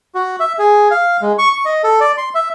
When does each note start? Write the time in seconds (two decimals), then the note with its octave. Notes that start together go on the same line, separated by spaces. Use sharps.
0.15 F#4
0.40 E5
0.59 G#4
0.91 F5
1.22 G#3
1.38 C#6
1.53 C#6
1.65 D#5
1.84 A4
2.00 D5
2.18 C6
2.35 E5